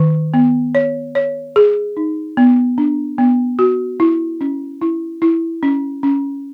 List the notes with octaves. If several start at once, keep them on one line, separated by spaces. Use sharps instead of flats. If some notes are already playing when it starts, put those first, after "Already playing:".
Already playing: D#3
B3
C#5
C#5
G#4
D#4
B3
D4
B3
F#4
E4
C#4
E4
E4
C#4
C#4